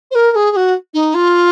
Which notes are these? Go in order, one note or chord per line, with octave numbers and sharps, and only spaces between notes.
C5
A#4
A#4
G#4
G#4
F#4
D#4
F4